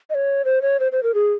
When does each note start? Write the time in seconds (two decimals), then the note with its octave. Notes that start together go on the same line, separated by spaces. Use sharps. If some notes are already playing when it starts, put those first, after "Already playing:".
0.10 D#5
0.15 C#5
0.45 C5
0.62 C#5
0.80 C5
0.92 C5
1.03 A#4
1.14 G#4